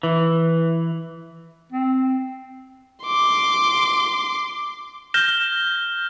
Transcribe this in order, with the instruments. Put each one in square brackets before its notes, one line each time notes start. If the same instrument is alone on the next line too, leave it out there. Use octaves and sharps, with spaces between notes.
[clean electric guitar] E3
[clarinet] C4
[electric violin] C6 D6
[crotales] F6 G6 A#6 E7 G7